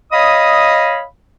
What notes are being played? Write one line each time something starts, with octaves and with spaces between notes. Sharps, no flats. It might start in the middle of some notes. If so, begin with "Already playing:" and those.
C#5 D#5 F5 B5 D#6